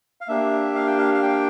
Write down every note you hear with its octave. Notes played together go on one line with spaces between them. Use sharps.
F5
A#3 D4 G4 E5
F5
G5
F5
F5
G5